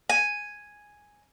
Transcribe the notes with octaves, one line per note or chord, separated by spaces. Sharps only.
G#5